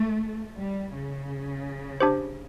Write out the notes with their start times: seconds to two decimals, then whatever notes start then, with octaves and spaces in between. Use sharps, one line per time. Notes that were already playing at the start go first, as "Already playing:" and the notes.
Already playing: A3
0.57 G3
0.93 C#3
2.00 D4 G4 C5